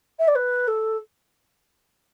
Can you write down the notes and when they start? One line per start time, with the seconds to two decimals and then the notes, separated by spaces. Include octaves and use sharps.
0.19 E5
0.27 D5
0.35 B4
0.67 A4